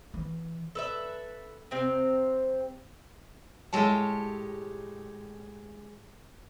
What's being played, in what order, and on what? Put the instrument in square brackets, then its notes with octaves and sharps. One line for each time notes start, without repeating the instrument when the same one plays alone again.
[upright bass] E3
[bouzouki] A4 B4 E5
C3 C4 F5
[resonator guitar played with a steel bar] A2 A4 A5 [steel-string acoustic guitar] G#3 G4 C#5